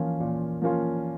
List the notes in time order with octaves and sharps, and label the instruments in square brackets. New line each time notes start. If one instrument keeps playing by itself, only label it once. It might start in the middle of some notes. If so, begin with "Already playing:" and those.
Already playing: [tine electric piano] E3 [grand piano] F3 A#3 C#4 F4
[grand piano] A#2
F3 A#3 C#4 F4